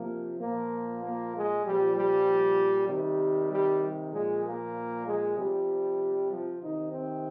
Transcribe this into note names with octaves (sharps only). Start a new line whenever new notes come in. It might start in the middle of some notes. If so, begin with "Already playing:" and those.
Already playing: C3 F3 A#3
A#2 F3 A#3
A#3
G#3
A#2 F3 G3
G3
C3 D#3 G3
G3
A#2 F3 G#3
A#3
G#3
C3 F3 G3
F3
C3 D#3 D#4
C4